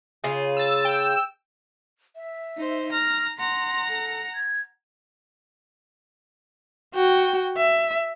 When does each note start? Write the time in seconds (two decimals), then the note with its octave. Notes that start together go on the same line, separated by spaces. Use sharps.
0.24 C#3 F4 G#4
0.57 E6 A6
0.85 G5 E6
2.16 E5
2.57 D#4 C5
2.92 A#5 F6
3.38 F#5 A#5 C6
3.89 A4
4.35 G#6
6.95 F#4 G5
7.57 E5